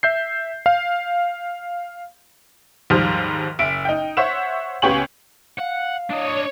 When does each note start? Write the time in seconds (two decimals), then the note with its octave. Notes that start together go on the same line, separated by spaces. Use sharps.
0.03 E5 G6 C7
0.66 F5
2.90 D#2 G#2 F3 G3 F6
3.59 F#1 E5 D7
3.85 D#4 G5
4.17 C5 C#5 E5 F#5 E7
4.82 C#2 B3 G4 C#5 G#5 F#7
5.59 F5 F#5
6.10 D4 C#5 D#5